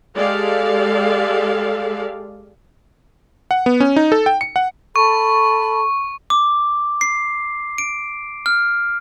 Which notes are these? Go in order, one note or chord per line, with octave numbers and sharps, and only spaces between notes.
G#3 G4 A4 D5 F5
F#5
B3
C#4
D#4
A4
G5
C#7
F#5
A4 A5 B5 C#6
D6
C7
D7
F6